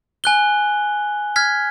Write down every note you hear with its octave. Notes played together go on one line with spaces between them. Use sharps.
G#5 F#6 G7
F6 G#6 B6